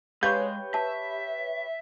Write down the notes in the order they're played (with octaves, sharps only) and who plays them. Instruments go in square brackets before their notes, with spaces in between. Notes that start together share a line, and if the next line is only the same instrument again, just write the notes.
[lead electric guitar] G#3 [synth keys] G4 B4 C#5 [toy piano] F5 [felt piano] G6
[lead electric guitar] E5 [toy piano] A5